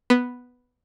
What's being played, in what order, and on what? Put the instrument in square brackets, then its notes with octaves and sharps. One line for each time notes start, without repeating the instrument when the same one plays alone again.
[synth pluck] B3